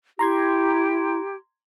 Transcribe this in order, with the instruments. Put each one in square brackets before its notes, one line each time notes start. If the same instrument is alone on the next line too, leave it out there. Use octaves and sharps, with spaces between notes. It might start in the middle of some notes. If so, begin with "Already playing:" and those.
[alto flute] E4 [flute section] G4 [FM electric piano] A#5 C6 G#6